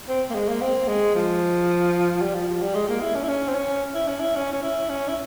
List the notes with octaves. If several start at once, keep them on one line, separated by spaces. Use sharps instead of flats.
C4
A#3
G#3
A#3
C4
G#3
F3
G3
F3
F3
G3
G#3
A#3
E4
C#4
E4
C#4
C4
C#4
E4
C#4
E4
C#4
C#4
E4
C#4
E4